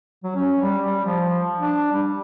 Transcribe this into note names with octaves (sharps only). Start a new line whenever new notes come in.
F#3
C#4
G3
G3
F3
D4
G3